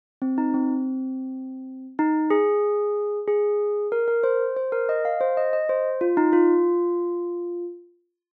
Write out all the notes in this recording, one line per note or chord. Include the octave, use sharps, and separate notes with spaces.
C4
D#4
C4
D#4
G#4
G#4
A#4
A#4
C5
C5
A#4
D#5
F5
C5
D#5
D#5
C5
F4
D#4
F4